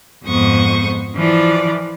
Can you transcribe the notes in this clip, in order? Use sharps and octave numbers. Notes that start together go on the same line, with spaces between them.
F2 G#2 B3 C5 C#6 D#6
E3 F3 D5